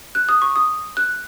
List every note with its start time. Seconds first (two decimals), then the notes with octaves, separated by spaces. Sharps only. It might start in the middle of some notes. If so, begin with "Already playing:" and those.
0.15 F#6
0.29 D#6
0.42 C#6
0.56 D#6
0.97 F#6